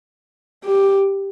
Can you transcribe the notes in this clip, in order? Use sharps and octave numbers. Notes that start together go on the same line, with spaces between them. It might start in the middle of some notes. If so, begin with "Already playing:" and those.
G4